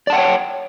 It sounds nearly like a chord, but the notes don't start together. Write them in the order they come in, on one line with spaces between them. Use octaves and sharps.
D5 A5 F#5 G5 C#5